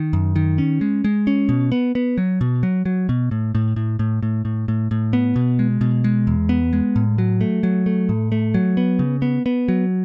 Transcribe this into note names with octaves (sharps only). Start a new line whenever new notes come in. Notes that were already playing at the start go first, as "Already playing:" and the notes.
Already playing: D#3
F#2
D#3
C#4
G#3
G#3
C#4
B2
B3
B3
F#3
B2
F#3
F#3
B2
A2
A2
A2
A2
A2
A2
A2
A2
B3
B2
G#3
B2
G#3
E2
B3
G#3
A2
F#3
A3
F#3
A3
A2
A3
F#3
B3
C#3
B3
B3
F#3